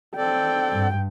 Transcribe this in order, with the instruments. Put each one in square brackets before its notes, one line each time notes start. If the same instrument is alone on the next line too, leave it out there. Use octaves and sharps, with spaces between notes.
[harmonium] C4 A4 D5 [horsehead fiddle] G5
[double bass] G2